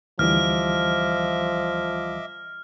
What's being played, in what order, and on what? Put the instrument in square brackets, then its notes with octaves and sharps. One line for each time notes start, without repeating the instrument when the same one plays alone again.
[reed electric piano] D2 E3 G3 [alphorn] F3 [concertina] D#5 E5 D6 [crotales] F6